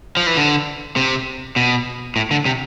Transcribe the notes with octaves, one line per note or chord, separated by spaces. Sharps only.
F3
E3
D3
C3
B2
A2
D3
C3